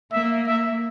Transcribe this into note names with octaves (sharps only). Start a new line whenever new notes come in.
A#3 E5
E5